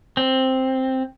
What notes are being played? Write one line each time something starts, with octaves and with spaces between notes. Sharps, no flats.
C4